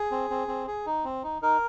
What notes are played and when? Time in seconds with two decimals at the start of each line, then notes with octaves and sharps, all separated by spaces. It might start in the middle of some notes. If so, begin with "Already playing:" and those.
Already playing: G#4
0.11 C4
0.30 C4
0.48 C4
0.67 G#4
0.86 D#4
1.04 C4
1.23 D#4
1.42 D#4 A#4